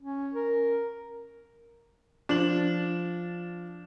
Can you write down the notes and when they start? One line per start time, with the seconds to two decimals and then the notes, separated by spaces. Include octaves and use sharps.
0.01 C#4
0.34 A#4
2.29 F3 D4 F#7